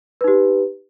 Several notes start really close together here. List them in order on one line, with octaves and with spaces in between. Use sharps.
B4 D#4 G4